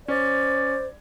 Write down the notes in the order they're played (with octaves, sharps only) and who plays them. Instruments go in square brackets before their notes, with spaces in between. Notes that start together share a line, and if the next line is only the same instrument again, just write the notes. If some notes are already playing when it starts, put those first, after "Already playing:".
[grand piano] C#4 [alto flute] C5 [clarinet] D5